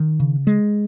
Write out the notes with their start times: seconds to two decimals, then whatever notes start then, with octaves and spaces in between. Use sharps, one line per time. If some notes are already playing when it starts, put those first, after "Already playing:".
Already playing: D#3
0.20 C#3
0.47 G#3